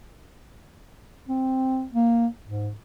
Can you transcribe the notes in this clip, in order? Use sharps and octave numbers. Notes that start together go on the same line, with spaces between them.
C4
A#3
G#2